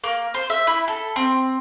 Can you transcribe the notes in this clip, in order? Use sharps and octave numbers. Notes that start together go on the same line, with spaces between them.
A#3
C5
E5
E4
A4
C4